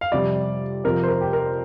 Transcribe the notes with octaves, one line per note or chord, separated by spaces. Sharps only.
F5
F2 C3 G3 D5
F2 C3 F3 A#4
C5
A#4
G4
A#4